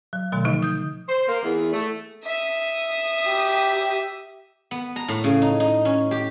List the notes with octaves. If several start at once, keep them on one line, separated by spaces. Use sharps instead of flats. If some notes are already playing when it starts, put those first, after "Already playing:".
F#3
B2 D#3 F#3 A3
D3 F3 D#4
D#6 G6
C5
A#3
E2
A3
E5 D#6
G4
B3
A#5
A2
C#3
D#4
D#4
C#4
G4